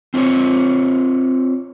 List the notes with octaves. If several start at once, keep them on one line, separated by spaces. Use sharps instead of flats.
C4 F4 F#4 A4 C5 C#5